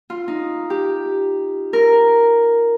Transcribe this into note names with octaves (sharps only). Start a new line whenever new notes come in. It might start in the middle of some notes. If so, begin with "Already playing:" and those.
F4
D#4
G4
A#4